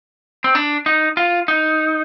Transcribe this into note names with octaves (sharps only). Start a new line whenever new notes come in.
C4
D4
D#4
F4
D#4